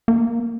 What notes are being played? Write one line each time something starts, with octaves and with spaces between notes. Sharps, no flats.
A#3